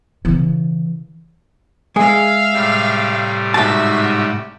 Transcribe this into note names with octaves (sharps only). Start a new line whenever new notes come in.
C#3 E3
G#3 G#4 E5 F5
A2 C3 G3
G#2 F#4 E5 A5